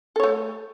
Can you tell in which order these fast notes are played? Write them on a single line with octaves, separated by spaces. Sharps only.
A4 C#5 A3